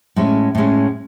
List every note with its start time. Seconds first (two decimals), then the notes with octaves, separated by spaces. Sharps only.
0.16 A2 G#3 C#4
0.55 A2 G#3 C#4